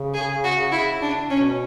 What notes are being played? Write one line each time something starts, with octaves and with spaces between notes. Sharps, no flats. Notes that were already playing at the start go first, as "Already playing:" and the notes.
Already playing: C#3
G#4
F#4
E4
D4
B2 C#4